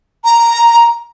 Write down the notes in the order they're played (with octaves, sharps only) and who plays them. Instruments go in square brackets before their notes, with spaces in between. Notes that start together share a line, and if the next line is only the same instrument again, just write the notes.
[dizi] A#5